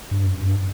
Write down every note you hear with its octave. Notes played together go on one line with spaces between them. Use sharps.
G2
F#2
G2